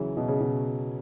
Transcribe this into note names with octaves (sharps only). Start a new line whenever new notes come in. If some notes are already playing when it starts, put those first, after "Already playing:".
Already playing: C#3 E3 F#3
B2
C#3
B2